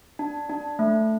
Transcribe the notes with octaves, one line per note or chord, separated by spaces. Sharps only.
D4
D4
A3